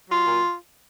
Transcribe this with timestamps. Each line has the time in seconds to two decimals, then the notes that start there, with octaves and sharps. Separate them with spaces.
0.09 F#3 F4
0.27 A#2